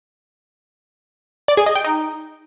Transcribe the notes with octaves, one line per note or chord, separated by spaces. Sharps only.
D5
G#4
D#5
G5
D#4